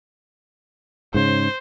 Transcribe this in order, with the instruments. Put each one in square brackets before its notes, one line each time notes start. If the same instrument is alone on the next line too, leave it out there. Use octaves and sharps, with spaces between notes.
[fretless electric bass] G#2 C#3 [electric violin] C5